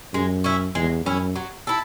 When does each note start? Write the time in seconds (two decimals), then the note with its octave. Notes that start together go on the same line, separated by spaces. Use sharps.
0.13 F#2 G#3
0.44 C#4 E4
0.75 E2 G#3
1.06 F#2 C#4 E4
1.36 F#3
1.67 E4 A4